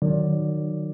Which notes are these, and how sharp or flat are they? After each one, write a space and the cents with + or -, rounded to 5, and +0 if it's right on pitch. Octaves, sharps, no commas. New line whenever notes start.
D#3 -30 F#3 +0 D5 +0